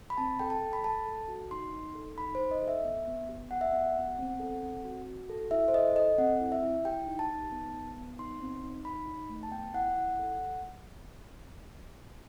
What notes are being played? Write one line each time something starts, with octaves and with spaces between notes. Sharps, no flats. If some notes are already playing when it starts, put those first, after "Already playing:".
B5
C4 A5
A4 G5
A5
A4
B5
A4 A5
A4
F#4
D#4 C6
D#4
A4
D#4 B5
C5
D#4
D#5
A4
E5
B3
B3
G4
G4 F#5
E5
B3 F#5
B3
C4
A4
C4
F#4
F#4
A4
E4 E5
C5
A4 D#5
A4 D#5
C4 F#5
E4
E5
E4
G4 G5
D#4
A5
D#4
B3
B3
B3
D#4 C6
C4
D#4
D#4 B5
D#4
A3
A5
B3 G5
E4 F#5
E4 F#5
A4